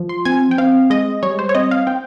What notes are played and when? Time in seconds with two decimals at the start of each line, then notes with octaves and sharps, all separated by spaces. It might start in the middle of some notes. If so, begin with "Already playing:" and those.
Already playing: F3
0.09 C6
0.25 C4 G#5
0.51 G5
0.58 C4 F5
0.90 G#3 D#5
1.23 G3 C#5
1.39 C5
1.49 C#5
1.55 C4 D#5
1.71 F5
1.87 C4 G5